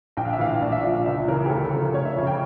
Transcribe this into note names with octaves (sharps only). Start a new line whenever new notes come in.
A#1 G5
F5
E5
A2 E3 F5
A#1 D5
E5
A#2 F3 F5
F5
C#2 E5
C#3 E3 A#4
G4
D2 A4
A4
C#3 F3
A#4
F1 C#5
E5
F2 C#3
G5